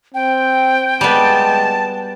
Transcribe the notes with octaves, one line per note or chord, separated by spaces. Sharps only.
C4 G5
G3 G#3 B3 A5